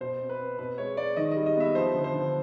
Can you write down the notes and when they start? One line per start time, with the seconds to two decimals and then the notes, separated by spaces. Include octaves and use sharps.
0.01 B2 C5
0.20 C4
0.30 B4
0.39 C4
0.58 B2 B4
0.78 G#3 C#5
0.97 G#3 D5
1.16 D#3 D#5
1.31 D#5
1.36 G3
1.46 D#5
1.56 B3 E5
1.75 F3 C5
1.94 D3
2.04 C5
2.14 D3